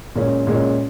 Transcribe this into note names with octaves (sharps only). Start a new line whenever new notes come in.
A#2 G#3 C#4
A#2 G#3 C#4